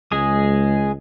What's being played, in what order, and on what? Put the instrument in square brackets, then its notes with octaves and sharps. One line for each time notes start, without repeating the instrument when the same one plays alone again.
[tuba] C#2 [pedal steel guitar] G#3 G#4 D#6